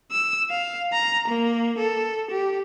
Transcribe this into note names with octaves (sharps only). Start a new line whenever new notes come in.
E6
F5
A#5
A#3
A4
G4